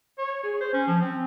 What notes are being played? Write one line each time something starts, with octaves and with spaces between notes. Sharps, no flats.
C#5
G#4
C5
C#4
F3
C4